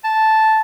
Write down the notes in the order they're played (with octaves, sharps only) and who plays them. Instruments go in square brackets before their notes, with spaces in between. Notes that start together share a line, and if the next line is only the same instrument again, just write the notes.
[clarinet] A5